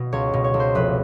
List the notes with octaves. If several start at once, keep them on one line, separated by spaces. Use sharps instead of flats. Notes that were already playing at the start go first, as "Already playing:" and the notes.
Already playing: B2
C#2 C#5
B2
C#5
C#2
C5
F1 B4